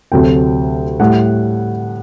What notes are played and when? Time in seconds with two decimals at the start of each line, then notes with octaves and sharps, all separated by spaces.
0.12 D2 C3 F#3 A3 G5
1.00 A2 G3 F#5